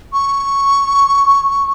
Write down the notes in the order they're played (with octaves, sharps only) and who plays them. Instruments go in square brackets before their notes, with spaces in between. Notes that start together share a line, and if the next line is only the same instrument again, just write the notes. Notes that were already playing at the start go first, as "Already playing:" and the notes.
[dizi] C#6